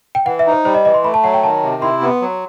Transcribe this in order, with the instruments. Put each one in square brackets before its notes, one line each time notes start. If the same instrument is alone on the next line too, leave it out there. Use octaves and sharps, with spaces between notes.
[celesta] G5
[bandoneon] E3 [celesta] F#5
[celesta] E5
[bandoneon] D#4
[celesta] C5
[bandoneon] G3 [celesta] C5
[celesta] D#5
[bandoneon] E3 [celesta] D#5
[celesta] C6
[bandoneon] A3 [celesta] B5
[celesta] A5
[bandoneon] F#3 [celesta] F#5
[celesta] G5
[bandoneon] D#3 [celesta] A5
[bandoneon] C3
[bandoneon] E4 [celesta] C6
[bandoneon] B3
F#3